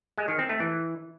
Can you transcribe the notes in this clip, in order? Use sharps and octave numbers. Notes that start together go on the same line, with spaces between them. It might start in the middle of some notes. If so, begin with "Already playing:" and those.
G#3
D#3
C4
A3
E3